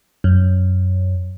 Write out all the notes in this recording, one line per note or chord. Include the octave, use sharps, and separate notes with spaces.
F#2